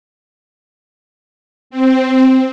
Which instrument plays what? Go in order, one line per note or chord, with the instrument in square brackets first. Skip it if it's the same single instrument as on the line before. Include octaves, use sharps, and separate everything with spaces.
[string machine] C4